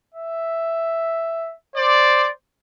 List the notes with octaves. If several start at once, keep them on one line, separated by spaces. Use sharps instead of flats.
E5
C5 D5